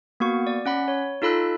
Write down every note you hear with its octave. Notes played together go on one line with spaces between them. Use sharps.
A#3 B3 F#4 C#6
D5
C#4 F#5 B5
C#5
D#4 F4 A4 B5 E6 F#6